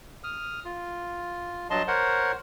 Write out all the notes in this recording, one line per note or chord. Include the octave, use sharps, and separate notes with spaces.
D#6 F6
F4
G2 F#3 D#5 A5 C6
A#4 C5 C#5 F#5